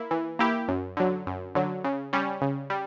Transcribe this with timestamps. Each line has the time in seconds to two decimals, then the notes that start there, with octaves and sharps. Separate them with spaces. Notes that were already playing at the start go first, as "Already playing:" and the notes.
Already playing: A#3 E4
0.11 E3
0.39 A#3 E4 G4
0.68 F#2
0.97 D3 F#3
1.26 F#2
1.55 D3 F#3
1.84 C#3
2.13 G3 C#4
2.42 C#3
2.70 G3